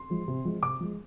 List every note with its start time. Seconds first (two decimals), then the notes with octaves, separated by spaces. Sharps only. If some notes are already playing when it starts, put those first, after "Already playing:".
Already playing: C6
0.10 F3 G#3
0.28 C3
0.45 F3 G#3
0.62 C3 D6
0.80 F3 G#3